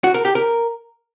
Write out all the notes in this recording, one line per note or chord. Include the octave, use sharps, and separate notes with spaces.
F#4
A#4
G4
A#4